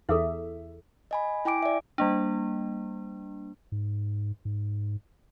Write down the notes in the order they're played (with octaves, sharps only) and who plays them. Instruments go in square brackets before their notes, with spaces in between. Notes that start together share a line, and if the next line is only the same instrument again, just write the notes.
[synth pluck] E2 E5 [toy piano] E4 G#4 A4
[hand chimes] D#5 G#5 B5
E4 G5 G#5 D6 D7
D5 E5
[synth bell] G3 A#3 D4
[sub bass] G#2
G#2